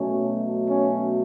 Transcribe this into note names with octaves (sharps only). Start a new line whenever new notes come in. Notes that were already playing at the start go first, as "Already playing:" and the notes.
Already playing: B2 F#3 A3 C#4
C#4